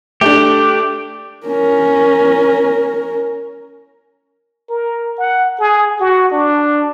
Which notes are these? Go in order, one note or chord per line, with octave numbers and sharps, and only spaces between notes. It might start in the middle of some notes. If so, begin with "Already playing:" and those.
A3 D4 G4
C#4 A#4
A#4
F#5
G#4
F#4
D4